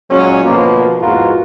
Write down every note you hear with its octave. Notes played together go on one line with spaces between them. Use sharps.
A#2 F#3 G#3 C#4
D2 B2 F3 A#3
A#1 E2 G#2 F4 F#4 A#4